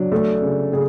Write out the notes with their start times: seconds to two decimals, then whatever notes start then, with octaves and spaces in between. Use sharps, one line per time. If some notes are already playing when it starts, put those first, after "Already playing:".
Already playing: F#3 D4
0.12 A3
0.42 C#3
0.73 C#3 G#4